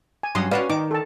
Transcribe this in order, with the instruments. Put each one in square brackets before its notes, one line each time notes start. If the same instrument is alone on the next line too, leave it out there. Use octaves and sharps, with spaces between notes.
[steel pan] G#5
[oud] G2 F#3 C#4 [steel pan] C6 D#6
[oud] C#4 F#4 C#5 [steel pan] B4 D5 F5
[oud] D#3 [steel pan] D#4 D6
[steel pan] A4 A5